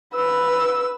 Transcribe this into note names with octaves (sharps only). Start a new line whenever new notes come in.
B4 E6